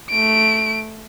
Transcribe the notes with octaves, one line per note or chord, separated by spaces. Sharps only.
A3 D7